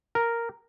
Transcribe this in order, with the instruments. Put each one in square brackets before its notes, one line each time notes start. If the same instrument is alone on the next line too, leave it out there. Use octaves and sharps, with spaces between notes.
[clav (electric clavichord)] A#4